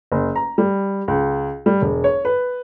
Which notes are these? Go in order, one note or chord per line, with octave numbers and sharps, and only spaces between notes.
F#1
A#5
G3
C#2
G3
E1
C#5
B4